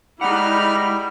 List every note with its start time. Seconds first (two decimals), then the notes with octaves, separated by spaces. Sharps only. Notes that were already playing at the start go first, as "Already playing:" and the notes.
0.21 G3 G#3 D#4 E4 F#5 B5 F6